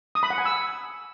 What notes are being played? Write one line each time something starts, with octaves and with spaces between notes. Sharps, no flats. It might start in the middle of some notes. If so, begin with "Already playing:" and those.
D#6
B5
F#5
G#5
E6